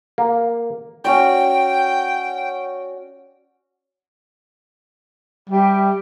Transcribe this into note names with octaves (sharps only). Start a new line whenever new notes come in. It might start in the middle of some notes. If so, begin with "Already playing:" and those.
A#3
C#4 F#4 D5 G5
G3 E5 G5